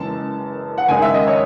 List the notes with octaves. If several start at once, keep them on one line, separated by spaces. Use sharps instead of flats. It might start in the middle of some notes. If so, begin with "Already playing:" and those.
Already playing: F#1 F#2 E3 G#3 A5
F#5
F#1 F#2 D#3 G#3 D#4 G#5
E5
D#5
C#5